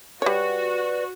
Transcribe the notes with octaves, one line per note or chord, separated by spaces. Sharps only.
G3 F#4 B4 C#5 D5